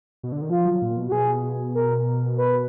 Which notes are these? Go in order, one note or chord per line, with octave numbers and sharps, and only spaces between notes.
B2
D3
D#3
F3 F4
F#3
A#2
B2
F#4
B2 G#4
A#4
B4